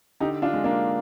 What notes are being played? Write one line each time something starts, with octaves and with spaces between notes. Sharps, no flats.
D3 D#4 G4
D4 F4
G#3
A#3 D4